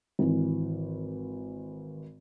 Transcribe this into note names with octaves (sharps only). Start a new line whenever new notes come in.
G#1 E3